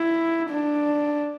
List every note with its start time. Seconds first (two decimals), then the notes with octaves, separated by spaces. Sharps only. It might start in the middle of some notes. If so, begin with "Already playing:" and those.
Already playing: E4
0.49 D4